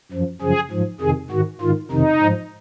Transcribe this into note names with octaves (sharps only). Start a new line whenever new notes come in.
F#2 F3
F#2 C#3 F3 G#4
G#2 F3
F2 C3 D#3 G#4
G#2 D#3 F#4
G#2 D#3 F4
F2 C3 D#3 D#4
G#2 F3